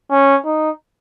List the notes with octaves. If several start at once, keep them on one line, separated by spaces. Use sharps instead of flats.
C#4
D#4